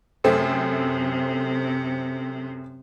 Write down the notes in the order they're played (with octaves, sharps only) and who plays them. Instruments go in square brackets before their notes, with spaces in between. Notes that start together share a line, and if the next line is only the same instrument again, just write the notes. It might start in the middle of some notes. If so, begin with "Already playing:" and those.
[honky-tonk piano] F#2 A3 C4 [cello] C3